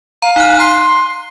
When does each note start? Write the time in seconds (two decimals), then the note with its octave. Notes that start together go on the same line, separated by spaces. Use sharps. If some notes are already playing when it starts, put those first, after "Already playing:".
0.22 F5 A#5
0.36 D#4 F6 F#6
0.59 A#5 C6 C7